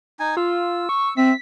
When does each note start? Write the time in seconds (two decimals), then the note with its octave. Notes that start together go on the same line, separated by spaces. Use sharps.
0.20 D#4 G#5
0.37 F4 E6
0.89 C#6
1.17 C4 E5 B6